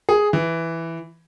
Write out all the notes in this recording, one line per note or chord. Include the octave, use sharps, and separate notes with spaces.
G#4
E3